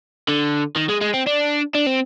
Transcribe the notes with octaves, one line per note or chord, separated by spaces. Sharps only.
D3
D#3
G#3
G#3
C4
D4
D4
C4